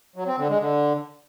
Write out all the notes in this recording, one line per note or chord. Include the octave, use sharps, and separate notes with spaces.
F#3
C4
D3
G#3
D3